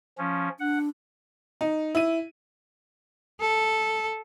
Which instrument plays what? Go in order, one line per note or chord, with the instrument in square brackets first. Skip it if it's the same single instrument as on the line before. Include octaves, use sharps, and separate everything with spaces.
[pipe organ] F3 C#4
[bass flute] D4 [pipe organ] F#5
[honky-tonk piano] D#4
E4 D#7
[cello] A4